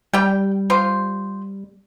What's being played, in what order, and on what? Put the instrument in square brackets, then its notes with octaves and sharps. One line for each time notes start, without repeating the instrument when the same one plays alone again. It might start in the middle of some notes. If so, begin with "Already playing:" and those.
[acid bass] G3 [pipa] G4 G5
[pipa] F4 G4 C5